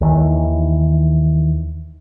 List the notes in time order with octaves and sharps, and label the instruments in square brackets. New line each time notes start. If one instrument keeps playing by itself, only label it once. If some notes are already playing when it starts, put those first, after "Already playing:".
[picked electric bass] D#2 D#3 E3